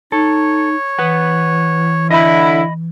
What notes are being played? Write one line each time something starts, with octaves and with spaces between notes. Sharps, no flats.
D#4 A4 C#5
E3 B4 F#5
D3 E4 D#5 B5